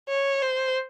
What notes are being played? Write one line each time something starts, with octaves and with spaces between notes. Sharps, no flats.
C#5
C5